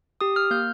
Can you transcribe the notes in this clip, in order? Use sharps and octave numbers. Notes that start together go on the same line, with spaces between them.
G4 D#6
F6
A#3 G6